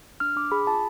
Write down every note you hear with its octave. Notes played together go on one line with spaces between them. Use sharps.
D4 F6
D4 D6
G#4 B5
F4 A5